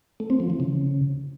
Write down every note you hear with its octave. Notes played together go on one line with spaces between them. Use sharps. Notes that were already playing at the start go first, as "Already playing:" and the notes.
A3
C4
F3
E3
C#3